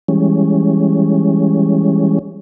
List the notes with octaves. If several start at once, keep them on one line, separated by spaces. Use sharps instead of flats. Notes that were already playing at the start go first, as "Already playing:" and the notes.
E3 G3 G#3 C#4